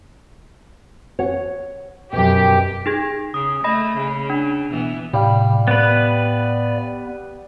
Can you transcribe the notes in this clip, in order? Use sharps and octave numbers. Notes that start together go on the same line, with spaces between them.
C#5 F#5
F#2 B2 G4
D#4 G#4 G#6
C#3 D#6
A3 D#5 B5 A#6
C#3
D4
B2 E3 B3
A2 C3 G3 F5
B3 B4 D5